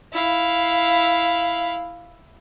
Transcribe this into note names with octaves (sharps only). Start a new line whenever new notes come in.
E4 F5